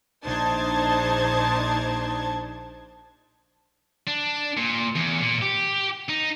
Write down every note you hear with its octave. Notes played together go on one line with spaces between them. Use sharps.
A#1 D4 D#4 C5 A5 G#6
D4
A#2
E2
A#2
G4
D#4